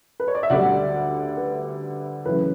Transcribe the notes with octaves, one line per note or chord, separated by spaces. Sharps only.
B4
C#5
D5
E5
D2 D3 G3 D5 F#5
B4
F#2 C#3 E3 A3 B4